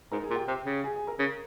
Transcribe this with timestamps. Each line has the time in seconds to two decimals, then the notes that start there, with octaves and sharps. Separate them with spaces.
0.12 G#2 A#4 A#5
0.24 G#4 G#5
0.30 A#2
0.36 G4 G5
0.48 C3
0.66 C#3
0.84 G#4 G#5
0.96 G#4 G#5
1.07 A#4 A#5
1.19 C#3